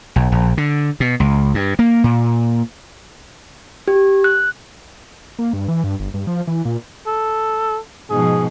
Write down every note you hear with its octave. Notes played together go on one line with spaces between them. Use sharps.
B1
A#1
D3
B2
C#2
G2
A#3
A#2
G4
F#6
A#3
G2
E3
G2
G1
G2
F3
E3
A#2
A4
G#2 B2 F3 G#4